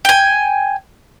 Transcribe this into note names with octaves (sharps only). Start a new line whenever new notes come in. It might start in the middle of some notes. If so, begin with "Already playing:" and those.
G5 G#5